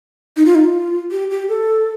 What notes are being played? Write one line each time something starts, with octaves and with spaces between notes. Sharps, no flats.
D#4
F4
D#4
F4
G4
G4
A4